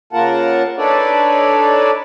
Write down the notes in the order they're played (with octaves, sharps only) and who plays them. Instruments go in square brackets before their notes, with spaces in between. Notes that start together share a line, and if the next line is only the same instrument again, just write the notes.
[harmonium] C#3 A#3 F4 A#4 F#5 A5
D4 D#4 A4 B4 C#5 D5